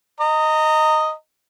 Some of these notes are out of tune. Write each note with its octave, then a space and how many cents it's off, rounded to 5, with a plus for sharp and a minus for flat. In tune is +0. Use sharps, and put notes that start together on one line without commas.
D#5 +0 A#5 -25